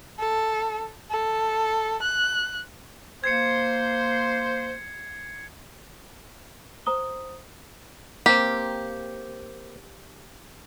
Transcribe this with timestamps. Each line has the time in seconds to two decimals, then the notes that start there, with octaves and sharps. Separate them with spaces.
0.19 A4
1.11 A4
2.02 F#6
3.24 A#3 C5 G#6 C7 C#7
6.86 C5 A#5 D#6 G7
8.26 A#3 C4 G4